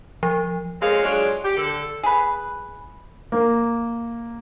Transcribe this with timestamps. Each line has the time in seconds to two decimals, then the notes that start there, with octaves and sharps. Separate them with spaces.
0.23 F3
0.81 A#2 G#3 C4 C#4 A4 F5
1.03 F#3 G#3 D4 F4 C#5
1.45 G4
1.57 D3 A4
2.03 G#4 B4
3.32 A#3